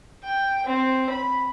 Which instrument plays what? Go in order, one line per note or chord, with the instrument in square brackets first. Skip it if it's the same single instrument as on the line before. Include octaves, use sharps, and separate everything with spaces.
[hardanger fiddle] G5
C4
B5